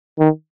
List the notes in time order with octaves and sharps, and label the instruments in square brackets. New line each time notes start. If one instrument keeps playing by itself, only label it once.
[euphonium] D#3